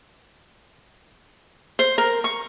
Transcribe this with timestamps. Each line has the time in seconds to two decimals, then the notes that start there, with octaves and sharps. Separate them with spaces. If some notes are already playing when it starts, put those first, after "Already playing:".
1.79 C5
1.98 A#4
2.24 C#6